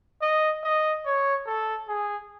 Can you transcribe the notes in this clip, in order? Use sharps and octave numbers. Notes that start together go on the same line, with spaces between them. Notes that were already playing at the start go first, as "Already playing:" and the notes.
D#5
D#5
C#5
A4
G#4